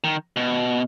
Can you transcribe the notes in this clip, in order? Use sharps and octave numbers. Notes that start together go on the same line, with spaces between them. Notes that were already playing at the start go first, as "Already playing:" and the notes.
D#3
B2